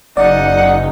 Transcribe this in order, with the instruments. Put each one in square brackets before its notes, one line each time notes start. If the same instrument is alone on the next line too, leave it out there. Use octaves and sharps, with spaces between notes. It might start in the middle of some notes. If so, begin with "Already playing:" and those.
[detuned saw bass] F#1 [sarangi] D#4 [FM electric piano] D5 [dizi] F#5